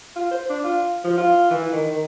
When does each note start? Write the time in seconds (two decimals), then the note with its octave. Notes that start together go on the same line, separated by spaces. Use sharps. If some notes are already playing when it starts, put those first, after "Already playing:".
0.16 F4
0.31 C5
0.50 D4
0.64 F4
1.04 F3
1.18 F4
1.51 E3
1.73 D#3
1.91 D#3